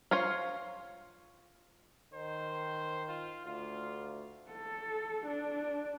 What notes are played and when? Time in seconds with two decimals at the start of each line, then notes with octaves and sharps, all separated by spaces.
0.11 F4 C5 C#5 F5
2.14 D#3 C5
3.08 F4
3.46 D2 F4
4.51 A4
5.27 D4